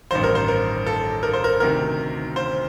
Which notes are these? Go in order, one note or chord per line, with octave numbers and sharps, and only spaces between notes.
A1 G2 D#3 C5
A#4
C5
A#4
A4
A#4
C5
A#4
D2 C3 D#3 A#4
C5